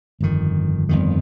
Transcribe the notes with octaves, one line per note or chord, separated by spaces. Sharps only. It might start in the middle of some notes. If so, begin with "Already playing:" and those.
G1 F2 D#3
G1 F2 D#3